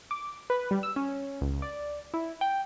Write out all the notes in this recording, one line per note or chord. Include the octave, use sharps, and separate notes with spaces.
D6
B4
G3
E6
C#4
C#2
D5
E4
G5